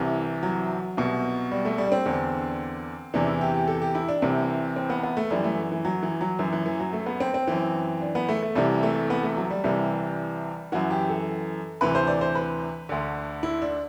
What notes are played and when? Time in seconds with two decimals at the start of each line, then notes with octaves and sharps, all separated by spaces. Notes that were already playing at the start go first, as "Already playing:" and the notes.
Already playing: C2 C3 E3
0.43 F#3
0.97 C2 B2
1.52 G3
1.65 A3
1.78 G3
1.87 D4
1.92 C4
2.06 E2 D3
3.14 E2 C3 E3 D4
3.27 E4
3.41 G4
3.54 G4
3.68 A4
3.82 G4
3.95 E4
4.08 D4
4.22 C2 C3 E3 C4
4.76 C4
4.90 B3
5.03 B3
5.17 A3
5.30 F#2 E3 G3
5.44 A3
5.72 E3
5.85 F#3
6.03 E3
6.21 F#3
6.39 F#2 E3
6.53 E3
6.66 E3
6.80 F#3
6.93 A3
7.06 B3
7.20 C4
7.34 C4
7.47 F#2 E3
8.02 D4
8.15 B3
8.29 A3
8.42 A3
8.55 C2 C3 E3 G3
8.83 A3
9.10 B3
9.23 A3
9.37 F#3
9.50 G3
9.64 C2 C3 E3 G3
10.72 F#2 E3 F#4
10.90 G4
11.09 A4
11.81 D2 C3 E3 B4
11.95 C5
12.08 D5
12.21 C5
12.35 B4
12.89 D2 D3
13.43 E4
13.62 D4